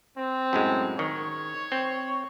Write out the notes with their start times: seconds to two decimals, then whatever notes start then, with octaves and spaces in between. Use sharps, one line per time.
0.17 C4
0.53 F#2 A2 G#3
0.99 D#3 C#5
1.72 C4